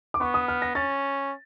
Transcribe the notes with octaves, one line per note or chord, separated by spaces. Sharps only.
D6
B3 C#6
D#6
F6
A#6
C#4 A6